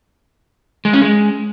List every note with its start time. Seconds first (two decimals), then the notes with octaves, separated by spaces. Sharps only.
0.85 G#3
0.93 C#4
1.01 G#3